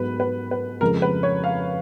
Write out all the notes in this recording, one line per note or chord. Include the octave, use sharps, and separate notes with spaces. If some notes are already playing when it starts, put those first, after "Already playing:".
Already playing: G#2 F#3 B3 B4
B4
B4
F2 C#3 G#3 A#4
B4
C#5
F5